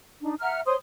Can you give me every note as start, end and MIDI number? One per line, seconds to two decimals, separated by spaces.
0.21 0.35 62
0.21 0.35 63
0.41 0.61 76
0.41 0.61 78
0.41 0.61 82
0.41 0.61 89
0.66 0.75 72
0.66 0.75 73
0.66 0.75 84
0.66 0.75 87